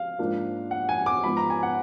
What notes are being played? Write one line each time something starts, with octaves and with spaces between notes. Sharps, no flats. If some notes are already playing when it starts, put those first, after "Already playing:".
Already playing: F5
G#2 F3 A#3 D4
F#5
G#5
D6
G#2 F3 B3 B5
A#5
G#5
F#5